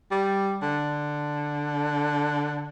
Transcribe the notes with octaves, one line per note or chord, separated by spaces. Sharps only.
G3
D3